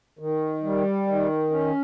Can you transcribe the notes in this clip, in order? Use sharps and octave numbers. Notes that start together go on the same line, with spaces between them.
D#3
G3
D#3
C#4